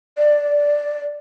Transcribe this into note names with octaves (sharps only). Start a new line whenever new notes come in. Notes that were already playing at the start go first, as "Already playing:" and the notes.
D5